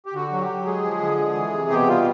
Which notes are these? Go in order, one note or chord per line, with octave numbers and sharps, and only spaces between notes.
G4
D3 F#4
F#3
G4
F#3
G#3 G#4
F3
D3
G#3
E3
C3
B2 G4
G3 F4